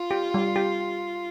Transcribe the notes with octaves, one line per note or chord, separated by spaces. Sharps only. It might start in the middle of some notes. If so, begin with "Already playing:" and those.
Already playing: F4
G4
G3
G4